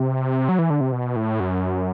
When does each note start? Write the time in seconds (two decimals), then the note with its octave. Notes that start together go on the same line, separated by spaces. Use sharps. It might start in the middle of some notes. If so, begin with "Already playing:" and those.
Already playing: C3
0.49 F#3
0.59 E3
0.70 D3
0.81 C3
0.92 B2
1.16 A2
1.40 F#2